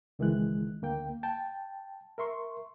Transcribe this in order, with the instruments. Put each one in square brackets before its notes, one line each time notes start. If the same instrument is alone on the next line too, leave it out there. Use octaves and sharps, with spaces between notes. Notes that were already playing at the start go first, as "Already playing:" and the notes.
[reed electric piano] C#2 D#3 E3 G#3 F#6
D2 A#3 G5
G5 A5
A#4 E5 C6 C#6